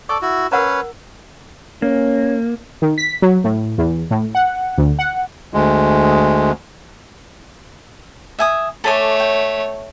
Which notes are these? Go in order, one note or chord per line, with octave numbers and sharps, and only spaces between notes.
A4 D5 C#6 D6
E4 F#4
C#4 A#4 B4 C#5 F#5 A#5
A#3 C#4
D#3
B6
F#3
A2
E2
A2
F#5
D2
F#5
D2 G#3
E5 G#5 D#6
A3 A4 C#5 G#5 D6
G5